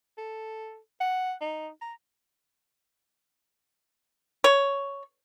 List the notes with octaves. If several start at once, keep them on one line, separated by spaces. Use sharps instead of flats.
A4
F#5
D#4
A#5
C#5